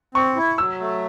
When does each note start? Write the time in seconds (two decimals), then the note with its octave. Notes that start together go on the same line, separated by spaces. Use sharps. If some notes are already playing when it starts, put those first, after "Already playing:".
0.15 C4 C#6
0.36 E4
0.58 F#3 E6
0.80 A3